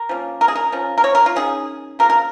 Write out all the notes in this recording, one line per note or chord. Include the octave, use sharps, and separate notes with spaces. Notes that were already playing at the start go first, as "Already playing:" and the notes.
Already playing: A#4
F3 A#3 C#4
A#4
G#4
A#4
F3 C#4
A#4
C#5
A#4
F4
D#3 C#4 G#4
C#3 F3 A#3 A#4
A#4